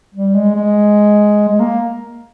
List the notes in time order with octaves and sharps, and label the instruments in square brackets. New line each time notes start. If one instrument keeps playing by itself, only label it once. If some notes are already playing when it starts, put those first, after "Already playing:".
[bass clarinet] G3
G#3
G#3
G#3
A#3